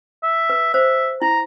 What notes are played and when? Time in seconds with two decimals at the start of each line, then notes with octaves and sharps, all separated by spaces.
0.23 E5
0.50 B4
0.74 C5 E5
1.22 E4 A#5